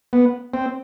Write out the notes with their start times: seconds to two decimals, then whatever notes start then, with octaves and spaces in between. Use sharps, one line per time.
0.13 B3
0.54 C4